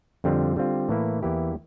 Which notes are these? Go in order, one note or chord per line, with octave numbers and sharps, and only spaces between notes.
F2 D3 G3 C4 F4
D3 G3 C4 F4
A2 E3 A#3 E4
E2 E3 A#3 E4 G4